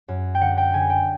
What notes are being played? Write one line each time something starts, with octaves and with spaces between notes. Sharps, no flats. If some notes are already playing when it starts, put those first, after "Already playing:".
F#2
G5
D3 F#5
G5
D3 G#5
G5